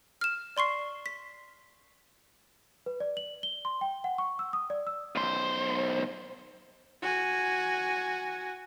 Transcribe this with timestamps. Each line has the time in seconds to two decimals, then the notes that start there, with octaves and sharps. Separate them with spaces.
0.21 F6 E7
0.57 D5 C6 C#6 C7
1.06 B6
2.86 B4
3.00 D5
3.17 F#7
3.43 G7
3.65 C6
3.81 G5
4.04 F#5
4.18 C#6
4.39 E6
4.53 D#6
4.70 D5
4.87 E6
5.16 B1 C5
7.02 F#4 G#5